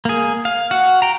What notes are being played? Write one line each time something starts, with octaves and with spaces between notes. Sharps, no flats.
A#3 G#4
F5
F#4 F#5
G5 A#5